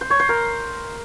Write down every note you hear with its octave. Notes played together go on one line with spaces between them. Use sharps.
C5
C#5
C5
A#4